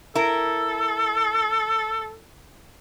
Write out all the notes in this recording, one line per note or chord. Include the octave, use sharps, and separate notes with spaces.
E4 A4 A#4